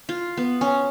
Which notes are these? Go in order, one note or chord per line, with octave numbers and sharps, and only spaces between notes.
F4
B3
C#4